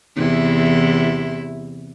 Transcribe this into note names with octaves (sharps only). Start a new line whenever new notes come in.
E2 C3 E4